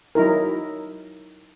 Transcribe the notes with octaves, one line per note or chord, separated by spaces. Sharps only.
F#3 D#4 E4 A#4